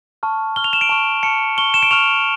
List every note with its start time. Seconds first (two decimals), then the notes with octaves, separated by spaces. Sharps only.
0.23 A5 C#6 F6
0.56 A5 C#6 F6 G7
0.64 F7
0.73 E7
0.81 D7
0.89 A5 C#6 F6
1.23 A5 C#6 F6 C#7
1.57 C#6 F6 G7
1.74 E7
1.83 D7
1.91 C#6 F6 F7